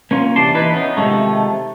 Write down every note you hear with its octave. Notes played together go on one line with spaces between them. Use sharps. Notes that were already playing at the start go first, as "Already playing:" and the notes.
A#3 C#4 F4
E2 C3 D5 A5 C6
E3 D#4 E4 B4
B3 C#4 D#4
C3 D#3 F3 G#3 A3